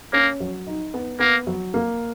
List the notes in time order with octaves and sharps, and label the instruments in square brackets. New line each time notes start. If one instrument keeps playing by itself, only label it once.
[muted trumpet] A#3 [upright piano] C#4
[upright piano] F#3
D#4
B3
[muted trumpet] A#3 [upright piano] B3
[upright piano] F#3
A#3